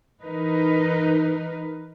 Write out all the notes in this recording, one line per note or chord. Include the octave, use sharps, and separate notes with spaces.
E3 D#4 A#4 B4